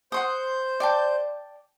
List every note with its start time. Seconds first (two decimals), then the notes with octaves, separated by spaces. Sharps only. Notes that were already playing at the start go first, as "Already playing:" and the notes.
0.12 C5 F#5 C6 D#6 G6
0.80 D5 G5 A5